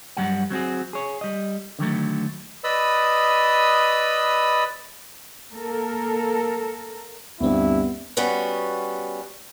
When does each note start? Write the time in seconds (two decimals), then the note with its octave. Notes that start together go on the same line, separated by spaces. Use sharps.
0.17 G2 F#3 G3 F#5
0.51 F#3 C4 F#4 G#4
0.93 G#4 C#5
1.21 G3 D#5
1.79 D3 D#3 F#3 A3
2.64 B4 D5 D#5 B5 D#6 E6
5.53 A#3 A4 A#4
7.41 D2 G2 B3 C4 E4
8.17 G3 B3 C#4 F#4